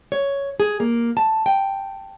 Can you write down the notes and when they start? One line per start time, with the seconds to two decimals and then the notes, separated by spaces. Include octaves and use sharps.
0.12 C#5
0.60 G#4
0.80 A#3
1.17 A5
1.46 G5